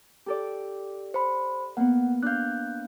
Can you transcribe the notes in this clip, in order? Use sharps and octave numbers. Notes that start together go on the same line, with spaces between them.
G4 A4 D5
C5 B5
A#3 B3 F#5
D4 F5 F#6 G6